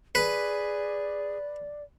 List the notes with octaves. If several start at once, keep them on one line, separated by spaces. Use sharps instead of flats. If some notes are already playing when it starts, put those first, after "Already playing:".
G#4 B4 D5